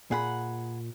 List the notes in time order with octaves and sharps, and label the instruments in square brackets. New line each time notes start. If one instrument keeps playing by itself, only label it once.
[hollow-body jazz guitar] A#2 [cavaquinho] G#4 F#5 B5